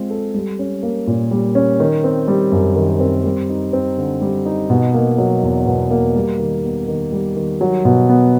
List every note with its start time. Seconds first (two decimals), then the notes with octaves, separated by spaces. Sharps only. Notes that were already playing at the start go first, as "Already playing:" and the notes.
Already playing: G#3 C4 F4
0.10 A4
0.34 G3
0.59 C#4
0.83 A#3
1.07 A#2
1.31 G3
1.55 C#4
1.80 D#3
2.04 C4
2.28 G3
2.52 F#2
2.76 D#3
3.00 C4
3.25 G3
3.49 D#4
3.73 C4
3.98 D3
4.21 G3
4.46 D#4
4.70 B2
4.94 A#3
5.18 F#3
5.43 E2
5.67 B2
5.91 A#3
6.16 G3
6.39 D#3
6.64 B3
6.88 D#3
7.12 G3
7.36 D#3
7.61 F#3
7.85 B2
8.09 B3